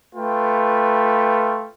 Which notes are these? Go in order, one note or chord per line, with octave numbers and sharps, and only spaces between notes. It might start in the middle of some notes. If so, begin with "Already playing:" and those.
A3 F4 B4 G5